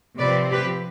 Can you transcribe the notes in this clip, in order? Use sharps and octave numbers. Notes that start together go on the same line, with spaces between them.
C3 F3 C4 B4 D5
G4 B4